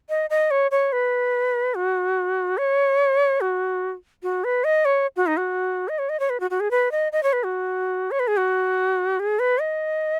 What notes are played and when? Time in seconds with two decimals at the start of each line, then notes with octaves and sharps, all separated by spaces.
0.09 D#5
0.30 D#5
0.51 C#5
0.71 C#5
0.92 B4
1.75 F#4
2.58 C#5
3.41 F#4
4.23 F#4
4.44 B4
4.64 D#5
4.85 C#5
5.16 F#4
5.27 D#4
5.37 F#4
5.89 D#5
5.99 C#5
6.09 D#5
6.20 C#5
6.30 B4
6.40 F#4
6.51 F#4
6.60 G#4
6.71 B4
6.92 D#5
7.12 D#5
7.23 C#5
7.33 B4
7.44 F#4
8.11 C#5
8.20 B4
8.28 G#4
8.37 F#4
9.20 G#4
9.39 B4
9.61 D#5